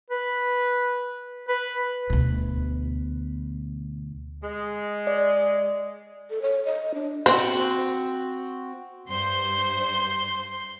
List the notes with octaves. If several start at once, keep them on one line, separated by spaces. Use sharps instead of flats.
B4
B4
D2 B2
G#3
D5
A4
C#5
D#5
D4
C4 F#4 C5
G2 C5 C6 G6